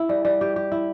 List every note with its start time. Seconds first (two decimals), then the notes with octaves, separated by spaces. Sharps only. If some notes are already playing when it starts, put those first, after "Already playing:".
Already playing: E4
0.09 G3
0.25 G3
0.41 G4
0.56 G4
0.72 E4